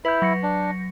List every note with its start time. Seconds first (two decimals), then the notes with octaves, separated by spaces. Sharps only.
0.05 E4 B4 G6
0.22 F#3 A#6 C#7
0.43 D4